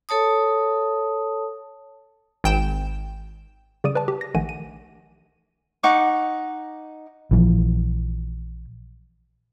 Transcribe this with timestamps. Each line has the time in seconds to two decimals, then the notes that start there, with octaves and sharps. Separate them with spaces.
0.09 A4 C#5 A5 D#6
2.44 G#1 G5 E7
3.84 C#3 G3 D5 D6 D#6 D#7
3.95 B4 D5 A5
4.08 G4
4.21 A#6
4.34 A#1 D#3 A3 F#5 G#5 D#7
4.49 D#7
5.83 D#4 F#5 C#6 D6
7.31 A#1 E3 F3